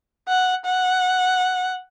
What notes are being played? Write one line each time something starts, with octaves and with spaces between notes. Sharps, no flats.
F#5
F#5